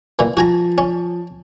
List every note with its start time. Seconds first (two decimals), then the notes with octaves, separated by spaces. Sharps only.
0.19 A#2 E3
0.37 F3 F#4 G#5 A#5
0.78 C#4